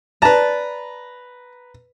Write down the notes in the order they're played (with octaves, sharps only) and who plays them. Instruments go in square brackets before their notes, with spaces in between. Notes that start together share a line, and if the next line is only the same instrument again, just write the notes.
[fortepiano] B4 A#5 [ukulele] D5 A5